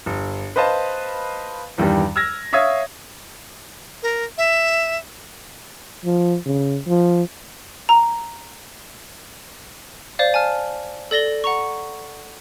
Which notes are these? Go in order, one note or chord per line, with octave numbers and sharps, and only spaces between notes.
G1
B4 C5 D#5 F5 A5
E2 G2 D#3 G3
E6 F6 G#6 A#6
C#5 E5 F5 D#6 G#6
A#4
E5
F3
C#3
F3
A#5
C5 D5 F5
G#5 A5 F6
A4 D5 A#6 G7
F#5 A#5 C#6